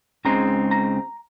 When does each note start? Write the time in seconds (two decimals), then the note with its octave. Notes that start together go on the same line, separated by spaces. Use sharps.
0.25 C#2 C#3 G#3 C4 D#4 A#5
0.71 A#5